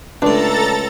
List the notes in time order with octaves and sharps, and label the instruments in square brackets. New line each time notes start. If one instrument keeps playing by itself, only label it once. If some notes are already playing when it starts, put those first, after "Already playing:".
[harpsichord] C#2 A2 [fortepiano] D4 [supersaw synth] A4 A#5 A6